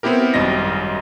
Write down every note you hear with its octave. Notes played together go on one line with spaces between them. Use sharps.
B3 C4 E4 G4 A#4
G#1 F#2 G3 D#5 A#6